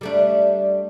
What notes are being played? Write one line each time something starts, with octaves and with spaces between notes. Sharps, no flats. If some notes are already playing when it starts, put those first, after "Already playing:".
G3 A3 D4